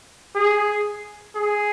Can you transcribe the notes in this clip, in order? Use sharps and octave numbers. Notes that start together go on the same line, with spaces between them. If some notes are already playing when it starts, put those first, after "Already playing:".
G#4
G#4